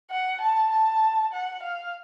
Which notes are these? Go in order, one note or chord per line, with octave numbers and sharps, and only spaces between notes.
F#5
A5
A5
F#5
F5